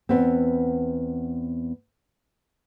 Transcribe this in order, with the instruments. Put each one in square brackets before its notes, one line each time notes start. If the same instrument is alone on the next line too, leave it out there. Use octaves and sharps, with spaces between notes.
[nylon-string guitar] E2 B3 C4